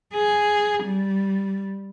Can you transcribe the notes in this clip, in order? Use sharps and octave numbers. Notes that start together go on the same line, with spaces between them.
G#4
G3